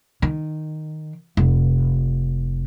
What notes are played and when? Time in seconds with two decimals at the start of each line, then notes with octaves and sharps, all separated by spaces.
0.22 D#3
1.37 F1